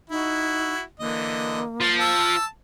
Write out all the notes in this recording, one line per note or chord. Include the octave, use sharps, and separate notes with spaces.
D#4 E4 F#4
D3 E3 A#3 D#5
F3 A6
A5 E6